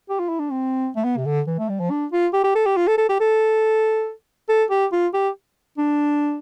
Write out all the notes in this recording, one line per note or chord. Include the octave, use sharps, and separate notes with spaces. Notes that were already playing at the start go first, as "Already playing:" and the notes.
G4
F4
E4
D4
C4
A3
B3
C3
D3
E3
A3
G3
F3
D4
F4
G4
G4
A4
G4
F4
A4
A4
G4
A4
A4
G4
F4
G4
D4